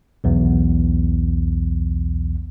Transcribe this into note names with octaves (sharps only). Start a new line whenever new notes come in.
B1 E2